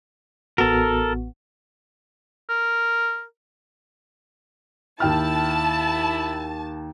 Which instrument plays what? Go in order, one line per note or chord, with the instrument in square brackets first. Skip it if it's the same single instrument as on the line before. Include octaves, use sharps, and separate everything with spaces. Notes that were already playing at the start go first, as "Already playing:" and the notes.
[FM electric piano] A1 B3 F#4 [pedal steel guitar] A4 A#4
[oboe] A#4
[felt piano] D#2 G5 F6 [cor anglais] E4 [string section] A5